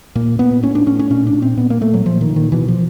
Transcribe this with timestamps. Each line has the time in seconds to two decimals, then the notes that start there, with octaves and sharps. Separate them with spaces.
0.15 A#2 A#3
0.39 A#2 B3
0.63 A2 C#4
0.75 D4
0.86 A2 C#4
0.99 C#4
1.10 A#2 C#4
1.27 D4
1.34 A#2
1.42 C4
1.57 A#2 B3
1.70 A#3
1.81 A#2 A3
1.94 F#3
2.05 A#2 F3
2.21 D#3
2.29 A#2
2.36 D#3
2.52 B2 E3
2.68 F3